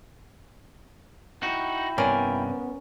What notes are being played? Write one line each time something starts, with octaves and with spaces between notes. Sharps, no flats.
D#4 E4 F#4 G5
G2 C3 B3 C#4 A#4 D5